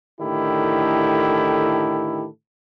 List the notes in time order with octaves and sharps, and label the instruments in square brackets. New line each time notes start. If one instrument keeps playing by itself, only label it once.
[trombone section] A2 D3 D#3 E4 G4 A4